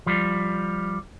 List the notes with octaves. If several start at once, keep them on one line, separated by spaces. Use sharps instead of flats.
F3 G3